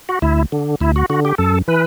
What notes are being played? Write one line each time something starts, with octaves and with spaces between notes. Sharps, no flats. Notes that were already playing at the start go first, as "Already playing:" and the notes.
F#4
D2 E4
D3
D2 E4
F#4
D3 F#4
G4
F#2 A4
E3 B4